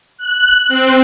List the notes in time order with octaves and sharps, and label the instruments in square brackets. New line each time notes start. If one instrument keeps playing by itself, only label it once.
[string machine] F#6
C4